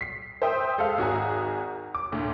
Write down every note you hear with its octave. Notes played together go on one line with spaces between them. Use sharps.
B6 C7
C5 E5 G5 D#6 E6
G#3 A4 E5 F5
G#1 F#4 G#4 A#5
D6
D2 A2